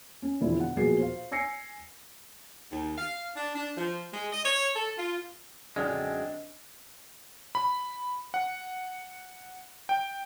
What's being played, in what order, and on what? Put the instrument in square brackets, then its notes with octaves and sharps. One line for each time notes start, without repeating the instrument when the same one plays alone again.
[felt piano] C#4
E1 D3 F3 E4
F#5
A#1 B2 F#3 A#3 G#4 C7
C5 F5
G#5 E6 A#6 C7 C#7
[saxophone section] D#2
F5
D4
D4
F3
G#3
D#5
C#5
A4
F4
[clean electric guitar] F#2 G#3 [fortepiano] D3 D#6 F6 [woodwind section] C4 D4 [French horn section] D#5
[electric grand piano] B5
F#5
G5